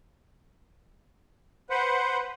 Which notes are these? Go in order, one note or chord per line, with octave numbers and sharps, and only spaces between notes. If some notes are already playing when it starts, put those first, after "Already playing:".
B4 C5 F#5